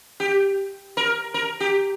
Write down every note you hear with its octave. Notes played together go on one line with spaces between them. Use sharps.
G4
A#4
A#4
G4